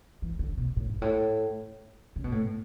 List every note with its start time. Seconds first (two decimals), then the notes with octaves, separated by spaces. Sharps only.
0.22 E3
0.39 D3
0.57 B2
0.76 A2
0.90 G#2
1.02 A2
2.16 C#3
2.24 B2
2.32 A2